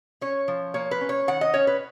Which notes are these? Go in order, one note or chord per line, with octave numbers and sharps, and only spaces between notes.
C#4 C#5
F3
A#3 C#5
B4
C#4
C#5
D#3 F#5
D#5
C#4 C#5
B4